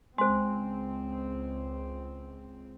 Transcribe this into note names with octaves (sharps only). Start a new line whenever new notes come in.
C#2 G#3 C4 C5 C6